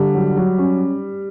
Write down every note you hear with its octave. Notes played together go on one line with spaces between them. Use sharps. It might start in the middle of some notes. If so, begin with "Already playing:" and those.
Already playing: D3 G3
F#3
F#3
C#4